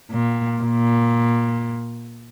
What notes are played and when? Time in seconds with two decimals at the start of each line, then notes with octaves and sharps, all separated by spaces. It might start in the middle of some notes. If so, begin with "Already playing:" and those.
0.11 A#2
0.62 A#2